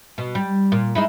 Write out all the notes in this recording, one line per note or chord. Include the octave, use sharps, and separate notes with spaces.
B2
G3
A#2
G#3 D#4 E4